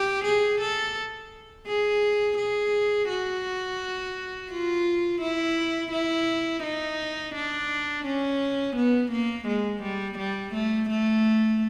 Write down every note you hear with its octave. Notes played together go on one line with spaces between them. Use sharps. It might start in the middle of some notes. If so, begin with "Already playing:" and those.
Already playing: G4
G#4
A4
G#4
G#4
F#4
F4
E4
E4
D#4
D4
C#4
B3
A#3
G#3
G3
G3
A3
A3